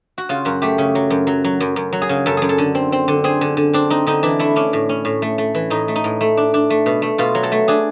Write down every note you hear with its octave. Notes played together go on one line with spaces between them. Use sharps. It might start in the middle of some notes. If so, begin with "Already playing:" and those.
F#4
C#3 F4
F#2 F#4
A3 G4
C#3
F#3
F#2
F#3
F#3
F#2
F#2
F#3
G#4
C#3
F#2 A4
F#2 G#4
A4
D3
C4
C4
D3
C4 G#4
D3
D3
C4 D4
C4 D#4
D3 D#4
E3 D4
A3 E4
C#4 D4
A2
C#4
A2
A3
A3
E3
A2 D#4
A3
D#4
A2
A3
D4
D4
A3
B2
A3
B2 F4
F#3
A4
A3
D4 G#4